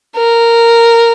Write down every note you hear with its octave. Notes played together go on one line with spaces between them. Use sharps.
A#4